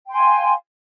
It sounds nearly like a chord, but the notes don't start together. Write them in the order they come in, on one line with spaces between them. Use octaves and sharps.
G5 C6 G#5 F5